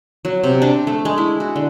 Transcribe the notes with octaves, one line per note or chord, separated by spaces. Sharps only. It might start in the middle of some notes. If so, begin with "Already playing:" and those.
F#3
C3
D4
A3
G#3
E4
F#4
D3